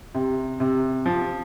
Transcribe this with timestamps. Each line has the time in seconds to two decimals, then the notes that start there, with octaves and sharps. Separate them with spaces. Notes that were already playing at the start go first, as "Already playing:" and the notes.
0.15 C3
0.60 C3
1.06 F3